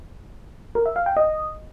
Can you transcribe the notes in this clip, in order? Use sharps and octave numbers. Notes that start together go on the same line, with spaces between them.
A#4
E5
F5
G5
D#5